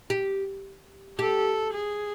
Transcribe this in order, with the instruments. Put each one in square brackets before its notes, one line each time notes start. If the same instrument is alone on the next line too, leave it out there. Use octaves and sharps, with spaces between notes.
[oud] G4
[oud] G4 [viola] A4
[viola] G#4